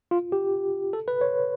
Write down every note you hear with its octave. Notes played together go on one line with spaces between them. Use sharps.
F4
G4
A4
B4
C#5